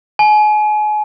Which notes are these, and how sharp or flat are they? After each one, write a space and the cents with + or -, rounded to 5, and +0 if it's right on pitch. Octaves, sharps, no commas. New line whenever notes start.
G#5 +35